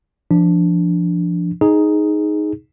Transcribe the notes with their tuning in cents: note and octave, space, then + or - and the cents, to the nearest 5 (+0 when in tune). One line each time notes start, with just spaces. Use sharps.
F3 -25 D4 +0
D#4 +0 G#4 +5